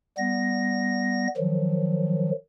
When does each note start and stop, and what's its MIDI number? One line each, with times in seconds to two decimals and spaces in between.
0.18 1.27 55
0.18 1.27 59
0.18 1.27 94
1.37 2.30 51
1.37 2.30 53
1.37 2.30 54